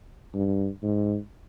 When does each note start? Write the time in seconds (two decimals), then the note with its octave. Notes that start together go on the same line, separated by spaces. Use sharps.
0.35 G2
0.83 G#2